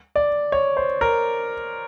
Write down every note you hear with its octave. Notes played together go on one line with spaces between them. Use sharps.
D5
C#5
C5
A#4